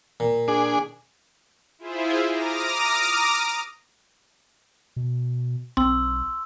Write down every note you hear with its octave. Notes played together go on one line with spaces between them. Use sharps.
A#2
D4 G#4
E4 F4 G#4 C5 E5
A#5 D6 D#6 F6 A#6
B2
B1 C4 C6 E6